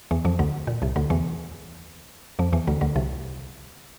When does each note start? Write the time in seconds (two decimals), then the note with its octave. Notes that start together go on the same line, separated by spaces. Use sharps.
0.11 E2 E3
0.25 F2 F3
0.39 D2 D3
0.67 A#2
0.82 C2 C3
0.96 D2 D3
1.10 E2 E3
2.39 F2 F3
2.53 E2 E3
2.67 D2 D3
2.81 D2 D3
2.96 C2 C3